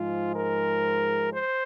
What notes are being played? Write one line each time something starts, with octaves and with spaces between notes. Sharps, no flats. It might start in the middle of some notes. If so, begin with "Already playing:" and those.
Already playing: G#2 F3 G#3 F4
A#4
C5